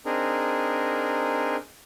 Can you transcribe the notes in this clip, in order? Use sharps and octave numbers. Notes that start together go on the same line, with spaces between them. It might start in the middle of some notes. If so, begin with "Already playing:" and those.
C4 D4 D#4 G#4 A#4